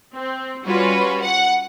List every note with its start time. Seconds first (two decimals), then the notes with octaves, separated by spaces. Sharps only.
0.14 C4
0.65 G3 C#4 F4 F#4 B4
1.23 F#5